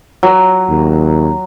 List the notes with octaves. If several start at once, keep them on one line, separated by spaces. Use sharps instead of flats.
F#3
D#2